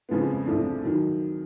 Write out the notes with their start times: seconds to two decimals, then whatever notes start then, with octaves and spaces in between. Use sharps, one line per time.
0.09 F2 C#3 F3 G#3 B3
0.46 C2 C3 F3 A3 D4
0.83 D#3 F#3